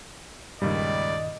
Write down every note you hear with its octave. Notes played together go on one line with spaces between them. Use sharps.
C#2 G2 A#2 D#3 G3 D5 D#5